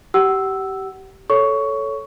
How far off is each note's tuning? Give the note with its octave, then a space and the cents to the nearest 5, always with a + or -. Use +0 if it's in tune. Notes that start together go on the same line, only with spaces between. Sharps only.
G4 -20 F#5 +30 E6 +0
A4 +0 C#5 +5 C#6 +15